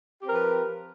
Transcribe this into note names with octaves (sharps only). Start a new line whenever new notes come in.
F3 C4 G4 A#4 B4